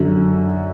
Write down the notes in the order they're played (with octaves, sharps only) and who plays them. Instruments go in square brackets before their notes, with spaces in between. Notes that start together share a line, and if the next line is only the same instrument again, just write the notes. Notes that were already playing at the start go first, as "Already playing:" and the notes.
Already playing: [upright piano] F#2 D3 F#3